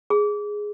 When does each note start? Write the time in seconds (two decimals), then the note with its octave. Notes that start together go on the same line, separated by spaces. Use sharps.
0.10 G#4